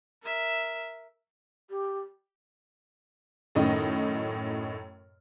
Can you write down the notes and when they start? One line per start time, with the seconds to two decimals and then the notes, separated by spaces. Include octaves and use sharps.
0.22 A#4 E5
1.70 G4
3.55 F#2 A2 D#3 D#5